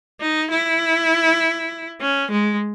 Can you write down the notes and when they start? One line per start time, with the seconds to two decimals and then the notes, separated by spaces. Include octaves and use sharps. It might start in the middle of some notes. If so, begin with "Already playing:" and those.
0.21 D#4
0.51 E4
2.02 C#4
2.32 G#3